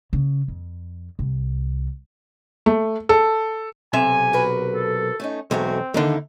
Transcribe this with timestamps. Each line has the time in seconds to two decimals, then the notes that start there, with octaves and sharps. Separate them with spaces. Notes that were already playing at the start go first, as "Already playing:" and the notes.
0.13 C#3
0.48 F2
1.19 C2
2.66 A3
3.09 A4
3.93 B1 C3 E5 G#5
4.33 F#4 A#4 B4
4.74 A4
5.20 A3 C#4 D#4
5.51 B1 E2 G#3 A3 C4 F#4
5.94 D#2 D3 A#3 D#4 E4